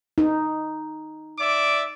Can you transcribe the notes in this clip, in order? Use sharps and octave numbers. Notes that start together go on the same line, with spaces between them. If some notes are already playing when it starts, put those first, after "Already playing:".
D#4
D5 E5 D6